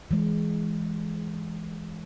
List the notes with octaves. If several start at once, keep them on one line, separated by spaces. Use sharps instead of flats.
E3 G#3